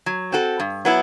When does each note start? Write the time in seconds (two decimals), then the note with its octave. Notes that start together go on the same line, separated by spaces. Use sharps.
0.06 F#3
0.32 C4 F#4 A4
0.60 G2
0.85 F#3 B3 E4